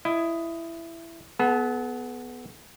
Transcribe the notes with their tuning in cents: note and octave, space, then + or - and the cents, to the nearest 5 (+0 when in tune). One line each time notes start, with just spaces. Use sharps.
E4 +10 D#5 +0
B3 +0 G#4 +45 A5 +0